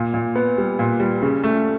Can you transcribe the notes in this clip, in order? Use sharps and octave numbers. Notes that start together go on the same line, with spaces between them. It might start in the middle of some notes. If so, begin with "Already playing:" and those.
Already playing: A#2
A#2
B3
G3
A#2
G3
C#3
A3